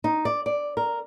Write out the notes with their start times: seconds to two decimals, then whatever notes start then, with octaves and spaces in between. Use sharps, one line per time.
0.04 D#4
0.25 D5
0.46 D5
0.77 A#4